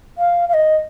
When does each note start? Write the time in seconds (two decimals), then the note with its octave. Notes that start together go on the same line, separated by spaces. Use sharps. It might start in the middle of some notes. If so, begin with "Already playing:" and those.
0.18 F5
0.49 F5
0.54 D#5